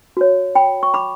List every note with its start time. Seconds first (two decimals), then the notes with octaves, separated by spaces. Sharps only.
0.17 F#4 C#5
0.55 G5 B5
0.83 C#6
0.94 B5 D6